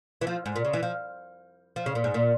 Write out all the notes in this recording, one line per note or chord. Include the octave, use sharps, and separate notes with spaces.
E3
F3
G#2
A#2
C#3
E3
F3
F3
C#3
A#2
G#2
A#2